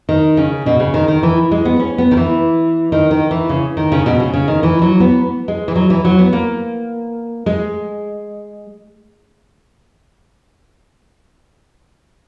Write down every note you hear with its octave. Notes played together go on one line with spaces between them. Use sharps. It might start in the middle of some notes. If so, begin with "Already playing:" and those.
D#3
C#3
B2
C#3
D#3
D#3
E3
G#3
B3
C#4
B3
D#3
E3
D#3
D#3
E3
C#3
D#3
C#3
B2
C#3
C#3
D#3
E3
F#3
B3
G#3
E3
F#3
E3
F#3
B3
A#3
G#3